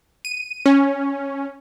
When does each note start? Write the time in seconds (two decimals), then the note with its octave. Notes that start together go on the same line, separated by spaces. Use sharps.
0.25 D#7
0.66 C#4